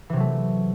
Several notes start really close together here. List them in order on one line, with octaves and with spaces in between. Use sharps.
E3 C3 F#3 A3